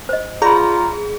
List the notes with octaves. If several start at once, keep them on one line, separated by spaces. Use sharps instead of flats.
C5 D#5
F4 G#4 D5 A#5 B5